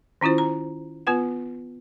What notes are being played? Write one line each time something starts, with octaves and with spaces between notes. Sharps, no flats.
D#3 C#4 E4 F4 C5
A#5
B3 F4 B4 F#5